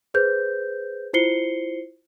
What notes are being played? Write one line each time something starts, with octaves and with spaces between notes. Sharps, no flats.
G#4 B4 C5 G6
E4 F4 C5 C7 C#7 G7